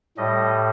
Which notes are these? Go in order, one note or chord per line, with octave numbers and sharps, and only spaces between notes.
A2 G3 D#5